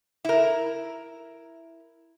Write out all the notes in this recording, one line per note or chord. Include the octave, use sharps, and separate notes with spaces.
E4 A#4